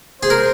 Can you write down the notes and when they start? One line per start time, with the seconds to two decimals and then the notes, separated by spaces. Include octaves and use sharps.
0.22 G#4 C5
0.30 A#4